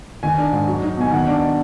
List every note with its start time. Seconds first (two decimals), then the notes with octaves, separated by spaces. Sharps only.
0.23 D#3 G#5
0.38 D4
0.53 G#2
0.67 F#3
0.82 D#4
0.97 B2 G#5
1.12 D#3 F#5
1.27 D4